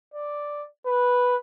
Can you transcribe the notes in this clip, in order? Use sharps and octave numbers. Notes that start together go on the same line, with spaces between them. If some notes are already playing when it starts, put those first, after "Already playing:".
D5
B4